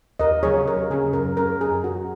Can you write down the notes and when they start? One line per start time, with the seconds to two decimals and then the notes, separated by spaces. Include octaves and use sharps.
0.19 D#2 A#4 D#5
0.43 C#3 F#3 C#4 G#4 C#5
0.67 D#2 A#4
0.90 C#3 F#3 C#4 G#4
1.13 F#2 A#4
1.37 F#3 C#4 A#4
1.60 F#2 G#4
1.84 F#3 C#4 F#4